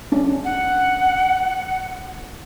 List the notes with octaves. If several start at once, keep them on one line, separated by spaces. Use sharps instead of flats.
C#4 D4
F#5